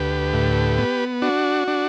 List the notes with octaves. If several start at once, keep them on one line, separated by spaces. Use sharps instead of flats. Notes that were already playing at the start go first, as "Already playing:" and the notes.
Already playing: D2 G4 B4
A2
B3
D4 F#4
D4